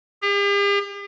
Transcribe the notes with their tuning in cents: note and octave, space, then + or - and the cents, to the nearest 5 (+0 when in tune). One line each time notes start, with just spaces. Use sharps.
G4 +45